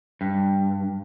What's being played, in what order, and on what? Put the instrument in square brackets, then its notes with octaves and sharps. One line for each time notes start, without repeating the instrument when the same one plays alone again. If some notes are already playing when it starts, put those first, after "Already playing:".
[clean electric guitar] G2